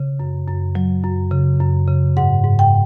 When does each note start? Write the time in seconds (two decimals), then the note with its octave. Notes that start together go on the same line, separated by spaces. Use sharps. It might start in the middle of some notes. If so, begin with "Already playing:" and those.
Already playing: C#3
0.20 F#2
0.48 F#2
0.75 F#3
1.04 F#2
1.31 C#3
1.60 F#2
1.88 C#3
2.17 G#2 F#5
2.44 G#2
2.59 G5